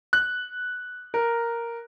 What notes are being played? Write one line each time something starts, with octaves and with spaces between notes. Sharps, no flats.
F#6
A#4